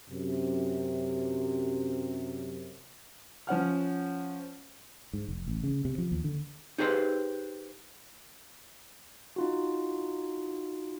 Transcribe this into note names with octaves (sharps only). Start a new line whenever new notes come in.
F#2 C3
F3 C#4 F#5 F6
G#2
F1
A1
C#3
C3
F3
D#2
D3
D#4 G4 G#4 B4 C5
D#4 F4 F#4